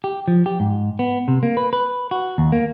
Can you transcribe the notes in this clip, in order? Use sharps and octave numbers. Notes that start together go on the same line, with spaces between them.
G4
F3
G4
G#2
B3
C3
A#3
B4
B4
F#4
D#2
A#3